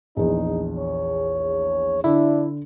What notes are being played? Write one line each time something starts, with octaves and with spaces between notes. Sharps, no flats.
A#1 E2 D#4
C#5
D3 D4 E4